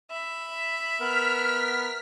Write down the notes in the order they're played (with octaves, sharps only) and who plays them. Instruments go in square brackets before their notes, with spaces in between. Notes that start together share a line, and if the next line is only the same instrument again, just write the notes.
[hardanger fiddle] E5 B5
[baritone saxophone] B3 [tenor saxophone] A#4 [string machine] F6 B6